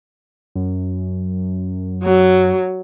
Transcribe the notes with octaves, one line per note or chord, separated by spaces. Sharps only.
F#2
F#3